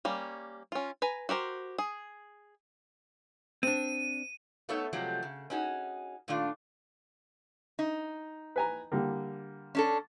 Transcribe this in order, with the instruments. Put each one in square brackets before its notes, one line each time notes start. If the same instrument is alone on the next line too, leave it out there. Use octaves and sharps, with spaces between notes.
[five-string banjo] G3 A#3 C#4
C#4 F4
B4 G#5 A#5
F#4 G4 A#4 C5
G#4
[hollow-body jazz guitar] C4 D4 [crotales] D#7
[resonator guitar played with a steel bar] A3 B3 D#4 A4 C#5 E5
C3 F3 F#3 G#3 A3
C#3
C#4 D#4 F#4 G#4
A#2 D#3 A3 D4 F4
D#4
[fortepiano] B4 G#5 A#5
D3 G3 A#3
[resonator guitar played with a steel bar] C#4 D4 A4